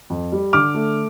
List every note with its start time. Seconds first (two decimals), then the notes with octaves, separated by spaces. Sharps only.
0.10 F2
0.32 G3
0.53 D3 D6 F6
0.74 A3